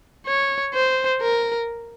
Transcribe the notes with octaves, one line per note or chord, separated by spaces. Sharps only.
C#5
C5
A#4